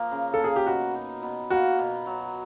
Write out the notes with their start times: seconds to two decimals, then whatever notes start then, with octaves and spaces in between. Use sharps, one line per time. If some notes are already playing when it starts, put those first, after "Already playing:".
Already playing: F3 A#3
0.11 C#3
0.34 A4
0.39 A#3 G#4
0.56 G4
0.67 B2 F#4
0.95 D#4
1.23 B2
1.50 A#3 F#4
1.79 B2
2.06 F#3